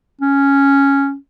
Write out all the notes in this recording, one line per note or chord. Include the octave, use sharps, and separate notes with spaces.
C#4